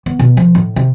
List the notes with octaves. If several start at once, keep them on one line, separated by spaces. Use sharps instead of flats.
B3
B2
F3
A2
C3